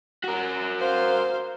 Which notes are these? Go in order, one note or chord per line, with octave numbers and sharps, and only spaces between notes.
F#4 A#4
C5 F5